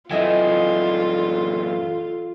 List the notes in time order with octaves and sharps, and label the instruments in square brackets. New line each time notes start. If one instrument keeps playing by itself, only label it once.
[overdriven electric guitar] F#2 E3 [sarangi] F4 [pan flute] A4 [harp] D#5 E5 G#5